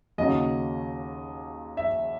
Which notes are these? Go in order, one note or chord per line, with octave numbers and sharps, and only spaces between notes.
D#2 C#3 F#3 D#5
E5